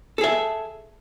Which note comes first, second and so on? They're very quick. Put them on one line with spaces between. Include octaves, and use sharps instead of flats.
A4 G#4 E5